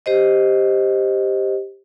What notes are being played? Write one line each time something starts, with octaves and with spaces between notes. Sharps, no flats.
G4 C5 D#5